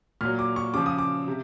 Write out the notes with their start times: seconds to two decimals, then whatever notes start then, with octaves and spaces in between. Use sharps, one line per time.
0.21 A#2 F#3 F6
0.39 D6
0.56 C#6
0.74 C#3 F3 D6
0.86 D#6
0.98 D6
1.28 C3